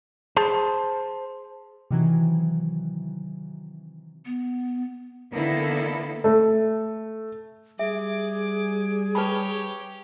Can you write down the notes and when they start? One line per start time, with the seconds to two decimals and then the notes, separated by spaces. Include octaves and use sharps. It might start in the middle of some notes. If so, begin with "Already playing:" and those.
0.37 G#4 C5 A5
1.91 C3 D#3 E3 F#3
4.26 B3
5.32 D3 D#3 A#3 B3 E4 A4
6.24 A3
7.79 G3 G#4 E5 D6
9.15 G4 B4 C#5 A5 B5